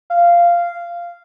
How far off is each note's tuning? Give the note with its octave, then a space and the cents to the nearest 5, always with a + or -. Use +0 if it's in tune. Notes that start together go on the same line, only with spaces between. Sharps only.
F5 -10